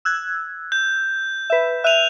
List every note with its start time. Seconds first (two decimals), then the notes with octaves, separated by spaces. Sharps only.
0.05 E6 F#6 G#6
0.72 G6
1.50 B4 E5
1.84 E5 F#6 D#7 F7